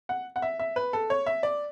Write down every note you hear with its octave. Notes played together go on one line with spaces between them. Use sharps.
F#5
F#5
E5
E5
B4
A4
C#5
E5
D5